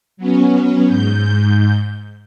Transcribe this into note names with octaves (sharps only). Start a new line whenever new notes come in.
F#3 B3 C#4
G#2 G6